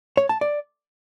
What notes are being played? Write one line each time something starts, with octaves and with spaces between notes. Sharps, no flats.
C#5
A5
D5